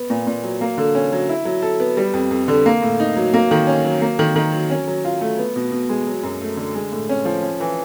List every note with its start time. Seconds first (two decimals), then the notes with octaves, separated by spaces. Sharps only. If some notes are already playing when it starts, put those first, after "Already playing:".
Already playing: B3
0.10 A#2
0.27 A#2
0.44 F#3
0.61 A#3
0.78 D3
0.95 C#4
1.12 F#3
1.29 E4
1.45 F#3
1.62 A4
1.80 B3
1.97 G3
2.13 F2
2.31 F2
2.48 D3
2.66 A#3
2.82 A2
3.00 D#4
3.16 F#3
3.34 A#3
3.51 D#3
3.67 C#4
3.85 F#3
4.02 A#3
4.19 D#3
4.36 D#3
4.52 F#3
4.70 C#4
4.88 F#3
5.05 F4
5.21 A3
5.38 B3
5.56 B2
5.72 B2
5.89 G#3
6.07 F#3
6.23 F#2
6.41 A3
6.57 D3
6.75 G#3
6.92 A2
7.09 C#4
7.26 F3
7.42 C#4
7.60 E3